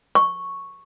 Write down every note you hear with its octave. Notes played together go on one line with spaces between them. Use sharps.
C#6